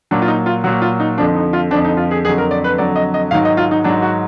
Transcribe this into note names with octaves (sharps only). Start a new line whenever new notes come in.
A#2 F#3 D4
F4
D#4
F4
A#2 F#3 F#4
F4
D#4
F2 D3 F3 D4
D#4
F4
F2 D3 F3 D4
D#4
F4
G#4
F2 D3 F#3 G#4
A#4
D5
B4
F2 D3 F#3 D5
D#5
D#5
G#2 D#3 F#3 F5
D#5
F4
D#4
G#2 D#3 F#3 D4
F#4